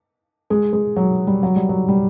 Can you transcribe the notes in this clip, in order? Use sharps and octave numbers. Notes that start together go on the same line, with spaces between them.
G#3
G#3
F#3
G3
F#3
G3
F#3
G3